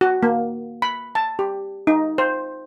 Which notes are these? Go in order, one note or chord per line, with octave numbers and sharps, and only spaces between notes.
F#4
A#3
B5
A5
G4
D#4
C5